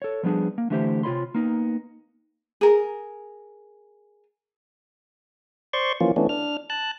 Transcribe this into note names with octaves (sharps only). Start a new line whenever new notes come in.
A4 C#5
F3 G3 B3 D4 G#4
A#3
D3 E3 A3 E4 G4 C5
C3 F4 B4 C#5 B5 C6
A#3 B3 D#4
G#4 A#4
C5 D5 C6 C#6
E3 F3 A#3 C#4 F4
E3 A3 B3 C#4 D4
D4 F6
A5 F#6